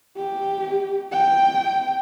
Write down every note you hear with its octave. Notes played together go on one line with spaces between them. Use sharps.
G4
G5